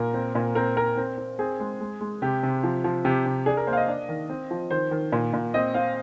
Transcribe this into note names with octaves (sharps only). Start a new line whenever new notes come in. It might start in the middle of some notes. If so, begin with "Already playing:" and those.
Already playing: A#2 A#4
C4
A#2
C4 A#4
C4 A#4
C4
C4
C4 G#4
G#3
G#3
G#3
C3 G4
C3
F3
F3
C3 G4
C3
D4 G#4
A#4
A#3 C5
F5
D#5
D4
D#3
C4
F3
D#3 C5
D#3
A#2
A#2
C4 D#5
C4 F5